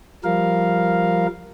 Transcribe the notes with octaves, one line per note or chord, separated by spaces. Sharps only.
F3 G3 A#4 F5